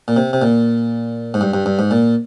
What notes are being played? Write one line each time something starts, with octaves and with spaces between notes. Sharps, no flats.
A#2
C3
C3
A#2
G#2
G2
G2
G2
G#2
A#2